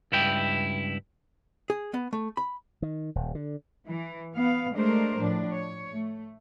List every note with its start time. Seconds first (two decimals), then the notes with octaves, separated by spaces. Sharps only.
0.12 C#2 G2 E4 G5
1.70 G#4
1.94 B3
2.13 A3
2.37 B5
2.82 D#3
3.15 D#1
3.35 D3
3.86 E3
4.34 B3 F5
4.73 G#3 A3 D4 A#4 C5
5.19 A2 F3 D4
5.51 C#5
5.93 A3